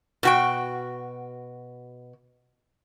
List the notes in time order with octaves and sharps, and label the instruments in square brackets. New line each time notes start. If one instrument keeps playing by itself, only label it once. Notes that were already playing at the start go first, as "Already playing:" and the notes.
[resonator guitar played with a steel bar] B2 F#4 G5